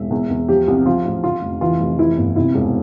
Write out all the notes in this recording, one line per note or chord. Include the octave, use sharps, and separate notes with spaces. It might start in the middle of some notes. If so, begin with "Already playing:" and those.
Already playing: E1 E5
E2
E2
F3 G4
C2
F3 F4
A1
D3 F4
F1
E3 F4
F1
E3 E4
G1
C3 E4
E1